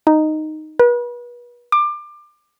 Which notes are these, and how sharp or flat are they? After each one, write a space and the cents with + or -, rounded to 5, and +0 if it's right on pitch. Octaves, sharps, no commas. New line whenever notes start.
D#4 -5
B4 -35
D6 +25